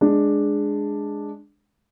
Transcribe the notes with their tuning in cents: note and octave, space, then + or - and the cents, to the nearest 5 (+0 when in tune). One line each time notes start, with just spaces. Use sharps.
G#3 +0 D4 +0